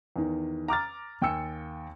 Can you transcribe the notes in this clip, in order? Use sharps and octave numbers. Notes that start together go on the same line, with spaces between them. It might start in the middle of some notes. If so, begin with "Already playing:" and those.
E2 D#3
A#5 D6 F6 A6
D#2 G5 G#5 E6 C#7